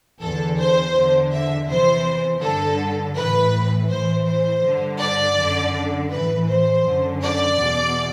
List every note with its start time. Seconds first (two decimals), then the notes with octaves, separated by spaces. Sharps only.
0.21 E2 D3 A4
0.59 C5
0.95 E2 D3
1.32 E5
1.68 E2 C3 E3 C5
2.42 G2 D3 A4
3.16 A2 E3 B4
3.90 A2 E3 C5
4.27 C5
4.64 G2 D3
5.01 D5
5.38 F#2 D3
6.11 A2 E3 B4
6.48 C5
6.84 F#2 D3
7.22 D5
7.58 E2 B2